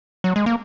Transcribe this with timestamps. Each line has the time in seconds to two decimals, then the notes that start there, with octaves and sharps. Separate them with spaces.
0.24 F#3
0.36 G#3
0.46 A#3